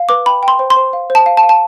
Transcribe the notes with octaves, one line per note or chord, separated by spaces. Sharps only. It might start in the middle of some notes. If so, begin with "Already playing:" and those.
Already playing: F5
B4 D6
G5 B5
G5
C6
C5
C6
C5
F5
C5
A5
F5
A5
F5
A5